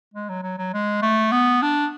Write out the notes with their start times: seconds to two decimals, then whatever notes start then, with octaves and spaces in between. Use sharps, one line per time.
0.14 G#3
0.29 F#3
0.43 F#3
0.59 F#3
0.74 G#3
1.02 A3
1.32 B3
1.62 D4